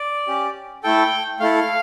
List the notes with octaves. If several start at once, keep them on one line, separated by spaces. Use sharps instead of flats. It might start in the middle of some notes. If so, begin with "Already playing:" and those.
Already playing: D5
C#4 G4
A3 E4 A4 G5
A3 E4 A4 F5